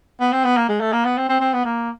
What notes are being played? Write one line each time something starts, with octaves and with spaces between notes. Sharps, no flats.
B3
C4
B3
A#3
G#3
A3
A#3
B3
C4
C4
C4
B3
A#3